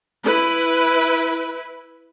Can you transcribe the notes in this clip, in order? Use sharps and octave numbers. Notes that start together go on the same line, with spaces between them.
E4 B4